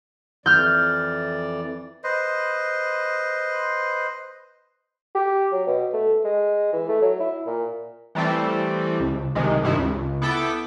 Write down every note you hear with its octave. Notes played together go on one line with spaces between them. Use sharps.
F2 E3 D5 F6 G6
B4 C5 D#5
G4
F#3
B2
A3
G#3
E3
A3
F#3
E4
A#2
E3 G3 A3 C4 A4
C#2
C2 C3 D#3 G#3
G2 C3 D#3 E4
C#2
B3 E4 A4 G5 D6